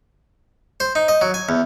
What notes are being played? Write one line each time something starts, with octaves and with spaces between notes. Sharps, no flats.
C5
D#4
D#5
F#3
G#5
E2